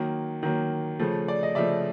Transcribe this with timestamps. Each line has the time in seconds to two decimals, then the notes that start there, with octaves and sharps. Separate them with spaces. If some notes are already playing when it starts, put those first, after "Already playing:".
Already playing: D#3 F#3 A#3
0.43 D#3 F#3 A#3
0.99 C#3 F3 A3
1.28 D5
1.43 D#5
1.55 C#3 F3 A3 D5 E5